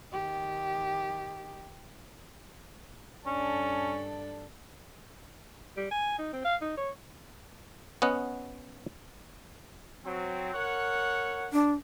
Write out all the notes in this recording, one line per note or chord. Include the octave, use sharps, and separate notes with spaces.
D#3 G4
G2 C#4 D4 A4
G3
G#5
D#4
C4
F5
D#4
C#5
B3 C#4 D#5 F#5
F#3 C4
A#4 C#5 F#5
D4